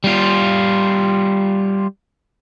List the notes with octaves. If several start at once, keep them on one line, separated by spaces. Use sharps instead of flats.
G3 F4